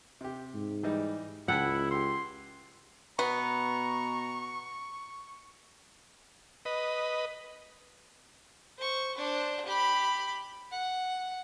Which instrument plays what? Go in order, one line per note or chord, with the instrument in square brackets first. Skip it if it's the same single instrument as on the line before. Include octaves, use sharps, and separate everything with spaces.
[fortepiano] C3 G4
[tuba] G#2
[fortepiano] E3 G3 D#4
[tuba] C#2 [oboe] E4 [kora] F#5 [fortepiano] G5 A5 B5
[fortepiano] G4 E6 [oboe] C6
[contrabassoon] B2 [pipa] B3 [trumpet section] A#5 [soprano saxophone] C#6
[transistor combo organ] B4 D#5
[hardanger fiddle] C5 C#6
D4 C5
G4 B5
F#5